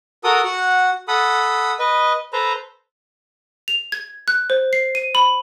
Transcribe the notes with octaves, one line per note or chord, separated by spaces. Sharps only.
F#4 A4 A#4 D#6
F#4 F#5
A4 F#5 B5 D#6
B4 D#5
A4 B4 C5 A#5
F7
G#6
F#6
C5
C7
D#7
B5